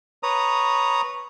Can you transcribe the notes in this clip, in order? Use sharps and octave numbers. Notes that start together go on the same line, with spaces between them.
B4 C#5 A#5 D#6